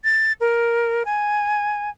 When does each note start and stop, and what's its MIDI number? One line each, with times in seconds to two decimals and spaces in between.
0.04 0.32 93
0.40 1.03 70
1.05 1.89 80